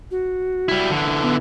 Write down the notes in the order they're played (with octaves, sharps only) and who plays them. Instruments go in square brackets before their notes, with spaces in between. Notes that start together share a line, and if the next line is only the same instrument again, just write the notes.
[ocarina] F#4
[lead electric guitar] G3 E4
D3 E3
[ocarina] B3